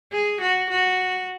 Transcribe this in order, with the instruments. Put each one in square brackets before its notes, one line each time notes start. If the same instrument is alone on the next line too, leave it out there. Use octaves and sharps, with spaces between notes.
[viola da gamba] G#4
F#4
F#4